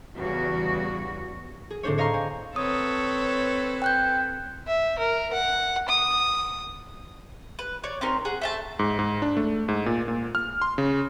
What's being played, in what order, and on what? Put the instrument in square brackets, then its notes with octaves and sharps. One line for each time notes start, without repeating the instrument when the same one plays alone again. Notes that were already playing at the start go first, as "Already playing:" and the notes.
[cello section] E2 C#3 G3 F#4
[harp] G#4
A2 D3 C4 D4 C5 C#5
C#5 D#5 F5 A#5 C6 C#6
C4 G#5
[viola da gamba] C4 A4 B4 [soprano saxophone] C#5 [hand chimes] D#6
[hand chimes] G5 F#6 G6
[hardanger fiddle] E5
A#4
F#5
D#6
[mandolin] B4
C#5 D5
C4 C#4 D#4 A#4
G#4 F#5
A3 E5 A5
[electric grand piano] G#2
G#2
D4
A3
G#2
A#2
A#2
F6
C6
C#3